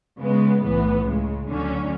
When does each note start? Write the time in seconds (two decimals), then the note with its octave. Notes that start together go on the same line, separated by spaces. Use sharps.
0.21 C#3 G#3 B3
0.62 B1 A2 E3 B3
1.04 C#2 C#3 G#3
1.47 D2 D3 F#3 C#4